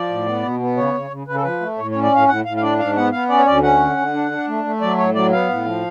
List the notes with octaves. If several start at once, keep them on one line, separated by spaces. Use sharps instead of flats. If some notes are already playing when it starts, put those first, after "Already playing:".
Already playing: F3 D5
A2
B3
B2
B3
C#3 C#5
C#3
C#3
C#3 B4
A4
F3 B4
A3
A2 C#5
C#5
C#4
D5
A2 F5
A2 F#5
A2 F5
F5
D4 D5
G#2 F5
B3 F#5
B3 F5
C#4 D5
C#5
D2 D5
C#4 F#5
D3
D3
D4
D4
A3
A3
F#3 D5
A2 C#5
F#3 D5
B3 F5
A2
F3